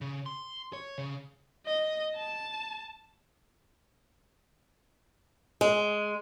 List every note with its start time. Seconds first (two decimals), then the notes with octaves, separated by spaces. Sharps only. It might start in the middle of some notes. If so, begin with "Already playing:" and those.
0.01 C#3
0.26 C6
0.73 C#5
0.98 C#3
1.66 D#5
2.15 A5
5.61 G#3